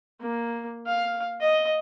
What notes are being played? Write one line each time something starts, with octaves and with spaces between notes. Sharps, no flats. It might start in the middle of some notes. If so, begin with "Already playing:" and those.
A#3
F5
D#5